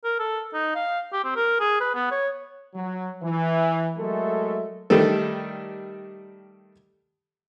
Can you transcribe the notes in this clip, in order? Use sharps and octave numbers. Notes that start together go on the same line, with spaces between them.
A#4
A4
D#4
F5
G4
C4
A#4
G#4
B4
B3
C#5
F#3
E3
F#3 G#3 A3 A4 A#4 E5
D#3 G3 A3 A4